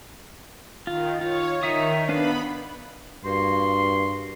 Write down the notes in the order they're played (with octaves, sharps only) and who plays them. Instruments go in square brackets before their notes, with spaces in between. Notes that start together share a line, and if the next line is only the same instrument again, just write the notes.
[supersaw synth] D#3 [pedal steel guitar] F4
[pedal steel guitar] F4 [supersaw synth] C#5
[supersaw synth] D#3 [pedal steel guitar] D#4 E5 D#6
[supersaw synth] B3 B5 [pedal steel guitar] D4 B4 F5
[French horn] G2 [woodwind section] A#3 F#4 C6